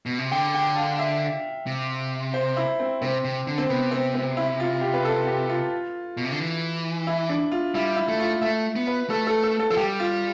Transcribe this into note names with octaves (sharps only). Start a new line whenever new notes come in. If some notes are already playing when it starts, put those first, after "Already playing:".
B2
C3
D3 G5
G5
F5
E5
C3
C5
E4
C4
C3 C4
C3
D3
C4
C3 B3
C4
C4
E4
F4
G4
B4
A4
G4
F4
B2
C3
D3
E3
E4
D4
F4
G3 E4
E4
A3
F4
A3 E5
B3
B4
A3 A4
A4
A4
A4
F3 A4
G3 G4
F4